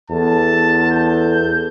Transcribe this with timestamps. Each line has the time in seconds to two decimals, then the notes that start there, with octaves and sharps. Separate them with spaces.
0.10 E2 A4 A5
0.92 G6